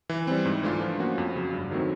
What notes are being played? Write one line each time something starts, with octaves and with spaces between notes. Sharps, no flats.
E3
G3 C4
G#2
E3 A3 D4 F4
F3
A#3 C#4 F#4
F2
C#3 F#3
G2
D#3 F#3 A3 C4